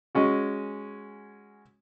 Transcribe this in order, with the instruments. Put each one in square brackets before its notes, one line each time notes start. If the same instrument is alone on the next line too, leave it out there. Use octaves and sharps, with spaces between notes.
[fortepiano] G#3 C#4 F#4